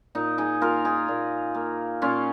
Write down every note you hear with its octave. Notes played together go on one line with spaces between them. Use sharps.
A#2 D#4
D#4 G#4
A#3 F4 A#4
D#4 G#4
A#2
A#3
A#2 C#4 F4